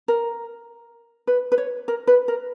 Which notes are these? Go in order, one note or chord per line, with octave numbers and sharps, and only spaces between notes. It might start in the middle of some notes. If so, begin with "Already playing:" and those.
A#4
B4
B4
C#5
A#4
B4
A#4